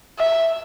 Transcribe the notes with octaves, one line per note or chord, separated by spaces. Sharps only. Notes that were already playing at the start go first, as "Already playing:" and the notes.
E5